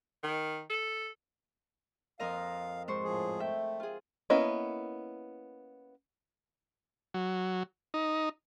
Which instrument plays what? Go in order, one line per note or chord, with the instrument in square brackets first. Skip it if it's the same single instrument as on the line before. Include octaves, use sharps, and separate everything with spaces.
[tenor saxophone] D#3
A4
[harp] F2 A#4 D#5 [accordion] F5
[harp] G#2 C5 C#6
[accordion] A2 F3 G#4
[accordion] A3 [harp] E5 G5
[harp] F4 G#4
[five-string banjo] A#3 B3 C#4 E4 D#5
[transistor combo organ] F#3
D#4